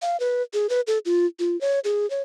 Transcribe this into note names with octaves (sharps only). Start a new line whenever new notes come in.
F5
B4
G#4
B4
A4
F4
F4
C#5
G#4
C#5